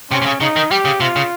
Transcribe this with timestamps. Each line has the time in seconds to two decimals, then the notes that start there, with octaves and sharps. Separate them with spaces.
0.11 C3 C#4
0.22 C3
0.26 C#3
0.41 C#3 D#4
0.56 D#3
0.71 G3 G4
0.85 C#3
1.00 C3 F4
1.16 C#3